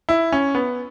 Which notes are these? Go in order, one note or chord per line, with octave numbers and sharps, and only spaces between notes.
E4
C#4
B3